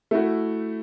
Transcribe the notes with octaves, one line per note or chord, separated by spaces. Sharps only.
A3 E4 F#4